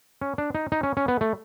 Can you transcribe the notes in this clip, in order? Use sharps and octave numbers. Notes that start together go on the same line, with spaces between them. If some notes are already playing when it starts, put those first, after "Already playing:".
C#4
D4
D#4
D#4
C#4
C#4
B3
A3